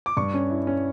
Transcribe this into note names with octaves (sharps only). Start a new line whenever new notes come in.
D6
G2 C#6
C#4
E4
C#4